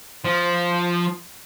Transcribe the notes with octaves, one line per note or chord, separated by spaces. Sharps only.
F3